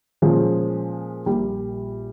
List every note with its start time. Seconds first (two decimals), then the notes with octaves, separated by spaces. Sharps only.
0.22 A#2 F3 G#3 C#4
1.26 A#1 A#2 G3